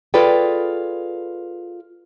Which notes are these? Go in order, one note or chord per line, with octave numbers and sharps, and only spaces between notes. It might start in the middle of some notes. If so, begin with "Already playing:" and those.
F4 G#4 A4 B4 D5 G5